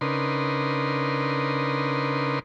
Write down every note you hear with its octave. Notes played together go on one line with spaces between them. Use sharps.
C#3 D4 D#4 A#4 B4 C6